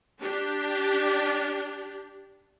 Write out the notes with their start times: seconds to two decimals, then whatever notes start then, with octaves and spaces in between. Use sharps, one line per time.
0.21 D4 G4